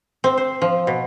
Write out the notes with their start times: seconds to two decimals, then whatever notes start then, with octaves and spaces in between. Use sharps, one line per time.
0.24 C4
0.37 C5
0.61 F3
0.87 B2